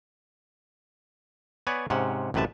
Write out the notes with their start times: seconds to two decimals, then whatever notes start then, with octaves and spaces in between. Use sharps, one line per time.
1.67 B3 B4 C#5 D5 G#5
1.90 G#2 C3 C#4 F#5
2.34 A1 F#2 C3 B4 E5 A5